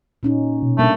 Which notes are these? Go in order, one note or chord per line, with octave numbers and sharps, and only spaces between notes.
A#2 C#4 D#4
B2
G3 A3 A#3 D4